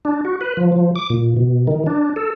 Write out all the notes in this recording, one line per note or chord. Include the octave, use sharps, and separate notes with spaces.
D4
F#4
B4
F3
F3
D6
A#2
B2
D#3
D4
A4